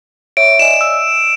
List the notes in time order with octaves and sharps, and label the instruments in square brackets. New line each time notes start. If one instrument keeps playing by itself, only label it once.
[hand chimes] C#5 E5 [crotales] D7
[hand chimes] D5 D#5 G#5 [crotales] E7
[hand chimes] E6